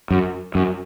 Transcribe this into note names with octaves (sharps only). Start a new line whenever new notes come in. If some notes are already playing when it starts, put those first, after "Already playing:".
F#2
F#2